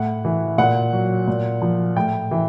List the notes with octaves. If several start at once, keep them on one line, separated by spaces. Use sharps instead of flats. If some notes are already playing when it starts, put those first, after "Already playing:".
Already playing: A2 F#5
E3
A#2 F#5
F#3
A#2
F3
A2 G5
E3